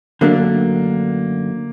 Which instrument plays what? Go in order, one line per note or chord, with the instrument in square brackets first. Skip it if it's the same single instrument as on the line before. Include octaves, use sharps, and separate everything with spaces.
[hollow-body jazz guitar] F#2 D3 F#3 A3 D4 [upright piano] A#3